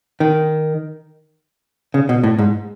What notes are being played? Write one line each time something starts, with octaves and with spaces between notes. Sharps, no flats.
D#3
C#3
B2
A2
G#2